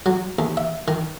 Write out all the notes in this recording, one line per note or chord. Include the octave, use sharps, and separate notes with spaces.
F#3
D#2
E5
D#3